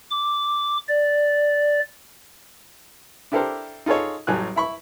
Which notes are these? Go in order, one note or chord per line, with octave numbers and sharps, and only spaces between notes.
D6
D5
D4 E4 G4 A4 A#4 C5
D#4 F4 G#4 A4 C#5
A1 A2 F#3 G3 G#5 F#6
E4 B5 C#6